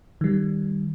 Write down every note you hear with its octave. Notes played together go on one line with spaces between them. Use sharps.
D#3 G3